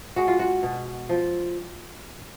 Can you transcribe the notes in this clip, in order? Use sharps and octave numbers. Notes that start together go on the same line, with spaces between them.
G#3 F#4
F4
F#4
B2
F3